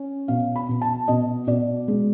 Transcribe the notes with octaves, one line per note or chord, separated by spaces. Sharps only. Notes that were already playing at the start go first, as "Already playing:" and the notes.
Already playing: C#4
B2 F5
B5
B2
A5
B2 D#5
B2 D5
G#3